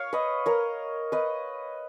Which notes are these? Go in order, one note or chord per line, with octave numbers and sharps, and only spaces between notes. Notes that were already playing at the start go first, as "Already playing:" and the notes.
Already playing: C#5 F5
B4 D#5
A#4 C#5
B4 D#5